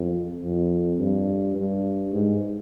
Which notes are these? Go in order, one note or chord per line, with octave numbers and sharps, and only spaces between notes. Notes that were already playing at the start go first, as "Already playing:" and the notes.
Already playing: F2
F2
G2
G2
G#2